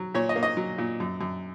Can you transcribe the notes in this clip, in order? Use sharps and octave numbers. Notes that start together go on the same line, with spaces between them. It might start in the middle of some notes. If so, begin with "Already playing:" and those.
Already playing: F#3
A#2 C#5
D#5
A#3
D#5
F#3
A#2
F#2
F#2